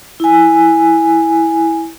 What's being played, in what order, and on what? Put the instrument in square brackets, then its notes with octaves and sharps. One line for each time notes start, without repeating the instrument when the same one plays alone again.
[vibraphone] E4 G#5